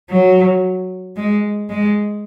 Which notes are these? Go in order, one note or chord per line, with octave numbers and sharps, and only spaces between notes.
F#3
G#3
G#3